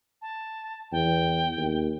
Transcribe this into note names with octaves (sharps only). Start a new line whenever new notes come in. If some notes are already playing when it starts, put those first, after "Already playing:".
A5
E2 G5
D#2